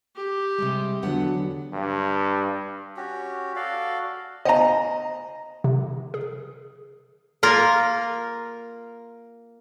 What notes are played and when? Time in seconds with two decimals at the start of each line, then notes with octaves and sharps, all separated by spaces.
0.16 G4
0.58 C3 G3 G#3
1.03 E2 D3 F#3 B3 F#5
1.73 G2
2.96 C#4 F#4 G4
3.56 F#4 A4 D5 F5
4.45 C5 D#5 F5 G#5 A#5
5.64 C3
6.14 G#4
7.43 A#3 F4 A#4